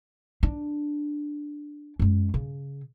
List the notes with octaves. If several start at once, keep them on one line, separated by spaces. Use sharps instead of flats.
D4
F#2 G#3
C#3